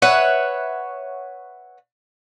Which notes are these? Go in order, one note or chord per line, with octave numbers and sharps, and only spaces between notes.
B4 C#5 E5 F#5